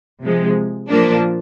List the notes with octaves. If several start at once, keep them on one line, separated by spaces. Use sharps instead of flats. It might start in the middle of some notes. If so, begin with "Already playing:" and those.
C3 F3 G#3
A#2 F3 A#3 D4